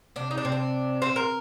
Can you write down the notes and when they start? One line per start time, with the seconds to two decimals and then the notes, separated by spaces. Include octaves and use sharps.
0.16 C3 D4
0.31 D#4
0.38 D4
0.45 C3 C4
0.52 D4
1.02 C4
1.16 A#4